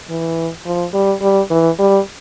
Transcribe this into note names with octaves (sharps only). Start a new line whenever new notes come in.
E3
F3
G3
G3
E3
G3